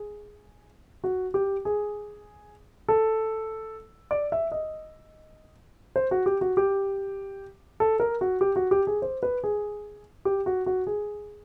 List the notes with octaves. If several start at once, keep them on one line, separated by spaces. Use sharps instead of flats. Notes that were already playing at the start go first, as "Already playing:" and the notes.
Already playing: G#4
F#4
G4
G#4
A4
D5
E5
D#5
C5
F#4
G4
F#4
G4
A4
A#4
F#4
G4
F#4
G4
G#4
C5
B4
G#4
G4
F#4
F#4
G#4